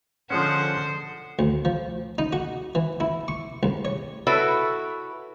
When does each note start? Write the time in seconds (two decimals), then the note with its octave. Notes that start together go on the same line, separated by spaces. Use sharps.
0.30 D3 F3 G#3 C#4 C5 F#5
1.39 D2
1.65 F3
2.18 D#4
2.33 F#4
2.75 E3
3.00 E4
3.28 C#6
3.63 C2
3.85 C#5
4.27 E4 F#4 A4 B4 C#5 E5